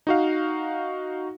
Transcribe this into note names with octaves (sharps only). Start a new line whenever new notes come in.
D#4 F#4 F5